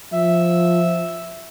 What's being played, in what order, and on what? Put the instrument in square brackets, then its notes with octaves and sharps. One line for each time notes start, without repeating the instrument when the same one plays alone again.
[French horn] F3 [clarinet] E5